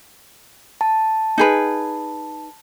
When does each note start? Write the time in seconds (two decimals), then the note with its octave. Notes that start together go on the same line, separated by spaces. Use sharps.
0.81 A5
1.38 D#4 G#4 B4